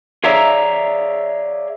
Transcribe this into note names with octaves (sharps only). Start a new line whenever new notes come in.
G#4 C#5 D5 E5 F5 A#5